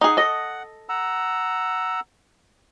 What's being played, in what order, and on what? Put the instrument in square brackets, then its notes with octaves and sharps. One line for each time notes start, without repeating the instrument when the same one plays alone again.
[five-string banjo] D#4 G#4 [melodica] F#5
[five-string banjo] A4 D#5
[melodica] F#5 A#5 E6